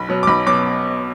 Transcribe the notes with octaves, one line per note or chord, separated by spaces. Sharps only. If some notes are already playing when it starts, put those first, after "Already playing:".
Already playing: B1 B5
B2 F#3
D6
B1 B5
B2 F#3 D6